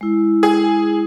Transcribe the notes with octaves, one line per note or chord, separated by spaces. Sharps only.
G#3 E4
G#4